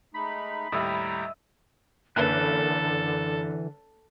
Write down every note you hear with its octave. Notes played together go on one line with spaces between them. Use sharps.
G#3 A3 D#4 B5
D#2 A2 G3 D#5 E5 G5 A#5
F#1 D3 E3 A#3 A4 B4 C#5 F#6